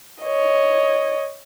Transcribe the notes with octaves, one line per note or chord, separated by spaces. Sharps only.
C#5 D#5